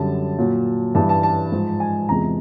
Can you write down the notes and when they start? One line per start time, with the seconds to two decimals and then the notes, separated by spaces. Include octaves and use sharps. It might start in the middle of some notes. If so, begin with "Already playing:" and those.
Already playing: F#2 D3 G3 A5
0.38 A#2 F#3
0.95 G2 E3 G3 A5
1.09 A5
1.23 A5
1.52 G#2 F3 G#3
1.80 G#5
2.09 E2 C3 F3 G#3 A#5